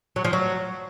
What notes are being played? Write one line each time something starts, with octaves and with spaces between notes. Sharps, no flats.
F#3
F3
F#3